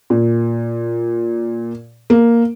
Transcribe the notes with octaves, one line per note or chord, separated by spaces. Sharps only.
A#2
A#3